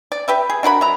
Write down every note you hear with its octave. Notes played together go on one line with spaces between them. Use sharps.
D5
G4 B4 E5
G#4
D4 F#4 A#4 B5
F#3 E5 A#5